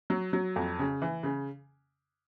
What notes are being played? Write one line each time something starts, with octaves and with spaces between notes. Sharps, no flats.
F#3
F#3
F2
C#3
E3
C#3